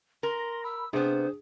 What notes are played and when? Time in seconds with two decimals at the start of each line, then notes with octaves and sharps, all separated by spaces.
0.23 A#4 C6 A#6
0.64 B5 E6
0.93 C3 B3 D4 G#4 C5